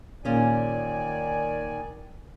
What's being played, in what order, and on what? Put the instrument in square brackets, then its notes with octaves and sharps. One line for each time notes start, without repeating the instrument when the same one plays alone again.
[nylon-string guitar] A#2 C#4 G#4 [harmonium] D#3 D5 G#5